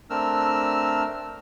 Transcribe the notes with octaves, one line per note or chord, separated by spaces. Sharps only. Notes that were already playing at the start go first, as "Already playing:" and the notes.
A3 C4 D4 A#4 E6 F6